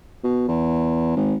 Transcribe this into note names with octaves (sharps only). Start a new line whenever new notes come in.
B2
E2
G#1